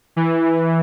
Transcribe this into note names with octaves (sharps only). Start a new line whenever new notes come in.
E3